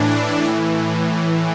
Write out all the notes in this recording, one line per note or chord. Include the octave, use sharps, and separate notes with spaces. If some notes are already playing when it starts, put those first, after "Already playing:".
Already playing: A2 E3 D4
D4
A2 E3